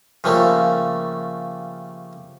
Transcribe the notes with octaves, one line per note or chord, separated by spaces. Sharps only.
C#3 F3 G3 A3 A#3